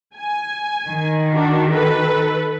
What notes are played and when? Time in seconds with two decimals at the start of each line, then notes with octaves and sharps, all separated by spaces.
0.16 G#5
0.89 D#3
1.33 D4 F#4
1.70 A4 B4